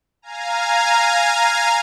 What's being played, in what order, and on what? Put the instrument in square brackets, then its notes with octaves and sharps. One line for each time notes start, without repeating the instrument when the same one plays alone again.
[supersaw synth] F5 G#5 A#5